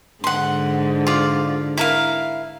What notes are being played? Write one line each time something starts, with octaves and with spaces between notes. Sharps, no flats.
G#2 D3 F#5 C6
F4 D5
E4 A#4 F5